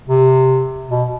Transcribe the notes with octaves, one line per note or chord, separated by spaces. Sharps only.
C3
B2